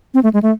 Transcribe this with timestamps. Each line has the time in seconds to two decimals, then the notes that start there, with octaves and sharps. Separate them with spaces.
0.14 C4
0.23 A3
0.34 G#3
0.43 A3